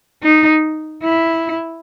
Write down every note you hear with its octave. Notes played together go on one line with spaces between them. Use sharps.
D#4
E4